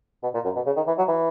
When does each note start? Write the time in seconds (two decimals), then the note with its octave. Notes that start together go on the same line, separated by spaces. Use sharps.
0.23 B2
0.34 A#2
0.44 F#2
0.56 B2
0.66 C#3
0.77 D#3
0.87 E3
0.98 F#3
1.08 E3